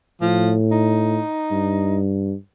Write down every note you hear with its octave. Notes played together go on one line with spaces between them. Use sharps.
A2 F3
D#4
G2